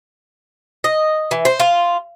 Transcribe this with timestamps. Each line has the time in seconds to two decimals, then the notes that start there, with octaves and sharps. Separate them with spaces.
0.84 D#5
1.31 E3
1.45 C5
1.60 F4